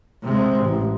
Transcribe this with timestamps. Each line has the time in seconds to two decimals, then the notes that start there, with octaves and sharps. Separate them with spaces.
0.23 C3 G#3
0.60 A1